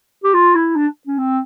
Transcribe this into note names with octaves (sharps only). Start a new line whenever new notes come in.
G4
F4
E4
D4
C#4
C4